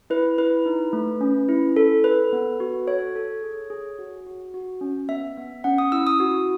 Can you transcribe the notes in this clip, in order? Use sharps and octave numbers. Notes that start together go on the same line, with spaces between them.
E4 B4
E4 B4
D#4
A3
C#4
E4
A4
A4 B4
B3
F#4
A4 C#5
A4
G#4
G#4
F#4
F#4
F#4
C#4
B3 E5
B3
C#4 F#5
D#6
E4 E6
D#6
F#4